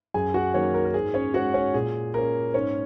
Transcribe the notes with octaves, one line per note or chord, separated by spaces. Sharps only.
F#2 G#4 G#5
F#4 F#5
D#3 F#3 A#3 C#4 C#5
A#4
A#4
G#2 G#4
C#4 C#5
G#3 C#4 F#4 F#5
C#4 C#5
A#2 G#4
A#3 C#4 A#4
G#2 C#4 C#5